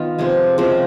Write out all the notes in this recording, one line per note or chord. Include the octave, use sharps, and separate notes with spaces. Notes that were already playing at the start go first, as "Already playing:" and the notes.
Already playing: D#3 B3 F4
C3 F3 G#3
C#3 F3 G#3 C4